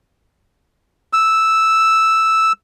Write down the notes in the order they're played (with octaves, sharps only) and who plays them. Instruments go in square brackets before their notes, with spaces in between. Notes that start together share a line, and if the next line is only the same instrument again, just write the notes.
[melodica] E6